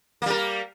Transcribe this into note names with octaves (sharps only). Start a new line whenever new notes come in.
G3 A#3 A#4